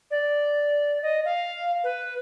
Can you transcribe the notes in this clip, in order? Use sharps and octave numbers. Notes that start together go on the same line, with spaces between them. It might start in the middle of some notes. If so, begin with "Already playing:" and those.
D5
D#5
F5
B4